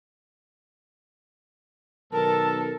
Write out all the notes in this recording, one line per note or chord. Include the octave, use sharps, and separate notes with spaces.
B1 D#3 A4 A#4 A5